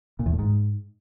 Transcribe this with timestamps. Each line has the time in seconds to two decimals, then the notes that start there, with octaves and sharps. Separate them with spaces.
0.19 A#2
0.26 E2
0.32 A2
0.39 G#2